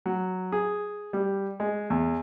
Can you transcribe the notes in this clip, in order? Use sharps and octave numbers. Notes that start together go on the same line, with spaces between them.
F#3
G#4
G3
G#3
E2